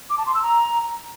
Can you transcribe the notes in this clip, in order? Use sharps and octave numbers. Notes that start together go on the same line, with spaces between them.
D6
A5
C6
E6
A#5